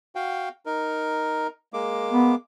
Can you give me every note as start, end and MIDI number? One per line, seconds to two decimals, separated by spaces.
0.15 0.49 66
0.15 0.49 77
0.15 0.49 79
0.66 1.47 63
0.66 1.47 70
1.73 2.35 56
1.73 2.35 58
1.73 2.35 86
2.11 2.33 59